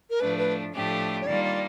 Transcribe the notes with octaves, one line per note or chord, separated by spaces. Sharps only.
A#4
A2 F3 A3 D4 B4
B4
A2 F3 A3 D4 G4
C#5
D#3 G3 A#3 D4 F4 D5
D5